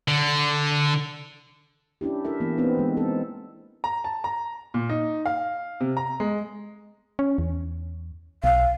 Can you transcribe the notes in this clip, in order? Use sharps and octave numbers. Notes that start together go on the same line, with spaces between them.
D3
C#4 D4 E4 G4
E4 A4 A#4 E5
E3 A#3 B3
B3 C4 D4 D#4 B4
E3 G#3
C4 A4
A#5
A5
A#5
A#2
D#4
F5
C3
A#5
G#3
C#4
E2
B1 F5